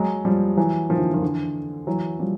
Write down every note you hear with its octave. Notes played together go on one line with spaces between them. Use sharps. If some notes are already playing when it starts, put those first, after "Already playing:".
Already playing: F#3 G#3
F3 G3
E3 F#3
D#3 F3
D3 E3
D#3 F3
D3 E3
E3 F#3
F3 G3